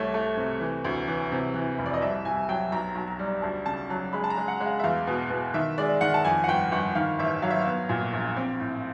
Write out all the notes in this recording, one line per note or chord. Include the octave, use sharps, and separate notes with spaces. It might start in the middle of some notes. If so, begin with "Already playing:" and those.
Already playing: C2 A3 C#5
A3
C3
E3
D2
E3
C3
E3
F1
D5
D#5
C2 E5
C2 G#5
F#3 G5
B1 A#5
B1 A5
A#5
G3
D2 A5
C#3 A5
F#3 A5
G#3 B5
A5
A#5
G#3
F#5
G#3
F5
E5
E2 F5
B2
B2
D#3 E5
G#3 D5
D#3 F#5
A5
F2 G#5
F#5
G1 G5
G1 F#5
D#3 F5
A1 E5
F#3 F5
E5
F5
B3
A#2
A#1
C4
A2